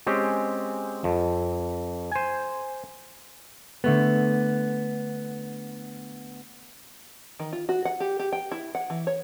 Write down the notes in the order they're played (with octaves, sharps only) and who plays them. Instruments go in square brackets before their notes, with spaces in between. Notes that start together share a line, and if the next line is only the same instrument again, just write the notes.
[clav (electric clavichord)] G#3 C4 C#4 G4
F2
C5 G#5
[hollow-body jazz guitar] D3 A3 B3
[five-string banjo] D#3
F4
F#4
F#5
G4
G4
G5
E4
F#5
E3
C#5